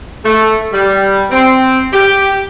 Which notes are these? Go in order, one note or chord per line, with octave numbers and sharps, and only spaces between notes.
A3
G3
C4
G4